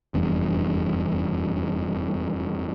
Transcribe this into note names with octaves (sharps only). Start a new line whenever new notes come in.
F1 E2 G2